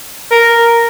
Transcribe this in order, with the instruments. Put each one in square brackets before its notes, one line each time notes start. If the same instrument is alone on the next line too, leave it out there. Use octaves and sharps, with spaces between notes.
[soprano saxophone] A#4